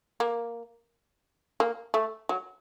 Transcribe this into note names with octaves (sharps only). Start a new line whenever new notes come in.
A#3
A#3
A3
F#3